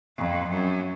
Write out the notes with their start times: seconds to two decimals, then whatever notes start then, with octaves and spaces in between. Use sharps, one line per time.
0.18 F2
0.50 F#2